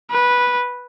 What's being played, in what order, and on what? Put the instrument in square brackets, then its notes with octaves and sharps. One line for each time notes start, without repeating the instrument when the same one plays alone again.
[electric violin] B4